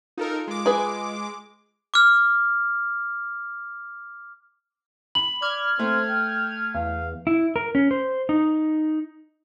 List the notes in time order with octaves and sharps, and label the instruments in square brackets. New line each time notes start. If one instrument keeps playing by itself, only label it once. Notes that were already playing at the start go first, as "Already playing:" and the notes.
[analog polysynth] D#4 A4 A#4 [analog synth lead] F4
[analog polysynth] G#3 D6
[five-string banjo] G#4 B4
[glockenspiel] D6 F6
[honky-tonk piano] B5 [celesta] F#7
[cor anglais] D5 [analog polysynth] F6 G#6
[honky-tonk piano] A3 [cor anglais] C4
[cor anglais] G5
[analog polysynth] E2 [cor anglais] F5
[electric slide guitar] E4
A#4
C#4
C5
D#4